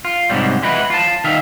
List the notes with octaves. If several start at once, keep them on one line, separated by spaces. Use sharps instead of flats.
F4
G#2 C3 F#3 G3
G#3 E4 F#4 B4
F4 A5
D#3 E5 F5